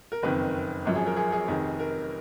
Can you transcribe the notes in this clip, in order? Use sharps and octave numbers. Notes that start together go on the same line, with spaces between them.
A#4
F#1 F2 D#3 B4
G#1 F#2 F3
G#4
A#4
G#4
G#4
F1 F2 D#3 G#4
A#4